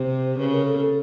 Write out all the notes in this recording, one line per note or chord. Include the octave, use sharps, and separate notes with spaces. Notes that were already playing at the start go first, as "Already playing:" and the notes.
Already playing: C3 C5
C#3 B4
A#4
A4
A4